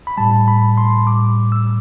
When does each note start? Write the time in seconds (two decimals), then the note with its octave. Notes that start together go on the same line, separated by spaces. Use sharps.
0.07 B5
0.18 A2 G3 A5
0.48 B5
0.77 C6
1.07 A2 G3 D6
1.52 E6